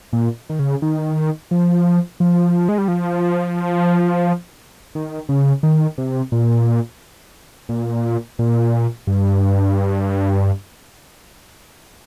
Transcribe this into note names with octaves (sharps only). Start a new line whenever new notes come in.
A#2
D#3
C#3
D#3
F3
F3
G#3
G3
F3
D#3
C#3
D#3
C3
A#2
A#2
A#2
G2